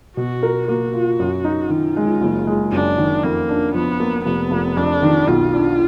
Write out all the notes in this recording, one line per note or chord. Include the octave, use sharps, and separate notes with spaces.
B2 F#4
A#4
A#3 F#4
F4
F#2
D#4
D#3 F4
G#3
F#1
G#3
F#2 D4
D#3
F2 A#3
D4
F3 B3
A#3
F1 B3
F1
F2 D4
D#3
B1 F4
D4